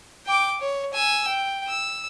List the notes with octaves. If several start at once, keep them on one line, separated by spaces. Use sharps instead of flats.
G5 D6
C#5
G#5 E6
G5
E6